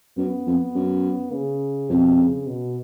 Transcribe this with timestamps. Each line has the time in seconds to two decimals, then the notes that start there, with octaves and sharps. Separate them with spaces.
0.17 F#2 B3
0.46 F2
0.75 F#2
1.32 C#3
1.89 F2 B2
2.18 C#3
2.47 B2